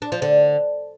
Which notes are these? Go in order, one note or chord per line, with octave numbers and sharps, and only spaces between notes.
D4
F3
D3